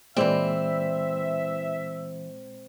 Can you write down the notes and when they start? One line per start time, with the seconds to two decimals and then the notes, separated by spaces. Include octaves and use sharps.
0.17 A#2 E3 G#3 C4 D5 E5